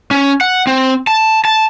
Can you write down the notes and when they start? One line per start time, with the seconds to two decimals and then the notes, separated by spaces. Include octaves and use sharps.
0.11 C#4
0.41 F#5
0.67 C4
1.07 A5
1.45 A5